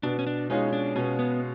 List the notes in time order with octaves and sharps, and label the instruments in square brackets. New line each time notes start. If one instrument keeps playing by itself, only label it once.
[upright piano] B2 [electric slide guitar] D4
[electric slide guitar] C#4
D4
[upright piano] G#3 C#4 F4 G#4 [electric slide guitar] D#4
[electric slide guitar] D4
[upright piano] B2 [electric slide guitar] C#4
[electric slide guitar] B3